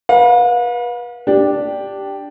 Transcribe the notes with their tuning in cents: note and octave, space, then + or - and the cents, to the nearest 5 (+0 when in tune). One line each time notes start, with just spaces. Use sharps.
B4 -30 F5 +40
D4 +0 G4 +0